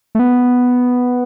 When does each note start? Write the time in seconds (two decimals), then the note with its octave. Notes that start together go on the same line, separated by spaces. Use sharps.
0.15 A3
0.19 B3